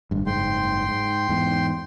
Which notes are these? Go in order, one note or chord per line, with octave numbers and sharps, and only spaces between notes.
G#1 G2
F#1 G#2 G5 C6
G#2
E2 G#2